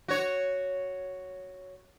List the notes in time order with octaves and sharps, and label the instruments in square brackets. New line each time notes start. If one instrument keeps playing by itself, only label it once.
[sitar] F#4 C#5